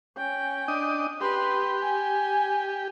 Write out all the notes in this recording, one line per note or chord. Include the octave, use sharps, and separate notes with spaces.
C#4 G5
D4 D#5 D#6
G4 B4 C6
G#5